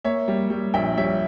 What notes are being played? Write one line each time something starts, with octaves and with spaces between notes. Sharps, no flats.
A#3 C#5 E5
G3
G3
A#1 E5 G5
G3 C#5 E5